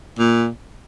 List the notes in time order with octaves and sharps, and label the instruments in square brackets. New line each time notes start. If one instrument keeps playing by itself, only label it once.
[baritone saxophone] A#2